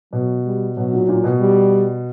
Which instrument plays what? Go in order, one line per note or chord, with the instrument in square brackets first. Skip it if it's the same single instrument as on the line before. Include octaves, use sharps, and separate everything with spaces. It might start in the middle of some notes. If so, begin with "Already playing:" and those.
[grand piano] B2 [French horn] F#3
[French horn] G3
[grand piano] B2 [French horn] F#3
[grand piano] A#2
A#2
B2
[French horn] G3